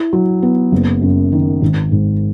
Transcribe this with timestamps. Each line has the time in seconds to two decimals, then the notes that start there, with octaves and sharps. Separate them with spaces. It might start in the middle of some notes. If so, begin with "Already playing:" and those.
Already playing: E4
0.13 F#3
0.42 B3
0.72 F#1
1.02 F#2
1.32 D#3
1.62 G#1
1.91 G#2